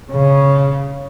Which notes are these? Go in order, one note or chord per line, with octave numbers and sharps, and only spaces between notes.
C#3